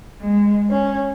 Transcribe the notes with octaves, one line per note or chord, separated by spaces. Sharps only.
G#3
C#4